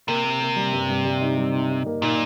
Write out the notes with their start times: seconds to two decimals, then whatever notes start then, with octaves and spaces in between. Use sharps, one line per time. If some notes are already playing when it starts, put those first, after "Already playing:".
0.08 C3 A#3
0.24 A#3
0.41 A#3
0.56 G3
0.73 G2
0.89 G2
1.05 G3
1.21 D#4
1.38 G3
1.54 D#4
1.70 D#4
1.86 A#3
2.02 A#2 D#4